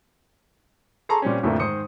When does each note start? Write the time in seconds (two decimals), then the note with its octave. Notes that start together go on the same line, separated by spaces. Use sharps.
1.09 G#4 A4 A5 A#5 C6 C#6
1.22 A#2 G3 C4 C#4
1.43 F2 A2 D3 F3 A3 A#3
1.60 G#2 D#3 C5 D#6 C#7